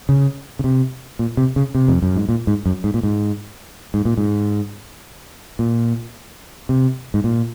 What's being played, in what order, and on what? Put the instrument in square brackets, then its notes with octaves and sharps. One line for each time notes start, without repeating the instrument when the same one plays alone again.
[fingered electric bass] C#3
C#3
C3
A#2
C3
C#3
C3
F2
F#2
G#2
A#2
G#2
F#2
G#2
A#2
G#2
G#2
A#2
G#2
A#2
C3
G#2
A#2